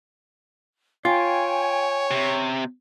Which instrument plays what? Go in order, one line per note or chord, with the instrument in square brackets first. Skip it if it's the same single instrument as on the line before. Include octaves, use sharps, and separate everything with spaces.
[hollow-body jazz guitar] F4 [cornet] C#5 [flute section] G5 G#5
[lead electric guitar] C3